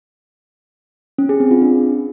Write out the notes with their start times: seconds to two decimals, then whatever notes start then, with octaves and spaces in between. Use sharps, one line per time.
1.18 C#4
1.29 G#4
1.40 C4
1.51 F4
1.62 D4